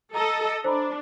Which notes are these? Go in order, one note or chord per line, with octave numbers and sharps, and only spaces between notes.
A4 D#5 A#5
D4 C5 A#5 B5